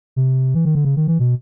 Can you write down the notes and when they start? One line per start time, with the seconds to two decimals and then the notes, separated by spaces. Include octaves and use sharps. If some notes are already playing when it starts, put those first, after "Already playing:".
0.16 C3
0.55 E3
0.65 D#3
0.75 D3
0.85 C#3
0.96 D#3
1.08 E3
1.19 B2